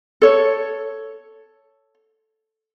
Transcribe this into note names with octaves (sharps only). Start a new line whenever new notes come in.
A4 C#5